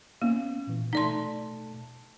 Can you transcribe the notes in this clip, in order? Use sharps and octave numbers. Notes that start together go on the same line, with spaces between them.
A#3 B3 C#4
A#2 E3
B2 A3 D#4 D5 A5 C6